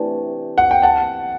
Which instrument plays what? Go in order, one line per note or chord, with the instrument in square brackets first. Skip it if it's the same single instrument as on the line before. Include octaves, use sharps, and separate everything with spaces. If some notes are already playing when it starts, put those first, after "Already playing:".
Already playing: [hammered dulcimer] C3 E3 A3 D4
[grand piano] F#5
G5
F#5 A5